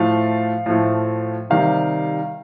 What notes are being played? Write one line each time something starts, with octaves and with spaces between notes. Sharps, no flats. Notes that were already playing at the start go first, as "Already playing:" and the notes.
Already playing: A2 F3 A3 F5
A2 F3 A3
C3 D#3 G3 F5